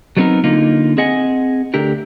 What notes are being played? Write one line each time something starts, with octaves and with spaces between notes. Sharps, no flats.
F#3 G3 B3 C4 D#4 A#4
D3 A#3 D#4 F4
C4 G#4 D#5 F#5 G#5
D2 D3 G4 A#4